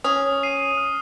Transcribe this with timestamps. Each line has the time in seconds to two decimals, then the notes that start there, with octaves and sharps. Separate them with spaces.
0.04 C#4 D#6
0.43 C7 D#7
0.77 F6